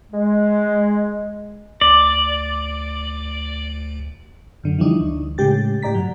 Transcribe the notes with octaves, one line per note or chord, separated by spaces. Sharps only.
G#3
D2 D5
F#2 D3 F#3
E3 F3 G3 D4 D#4
D2
A2 C#3 G#3 G4 A6
A2 G4 D5 A#5 B6
G2 F#3